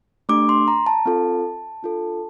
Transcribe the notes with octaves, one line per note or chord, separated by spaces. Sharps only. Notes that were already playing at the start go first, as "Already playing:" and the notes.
A3 D4 G4 D6
C6
A#5
A5
C4 F4 A4
D4 F4 A4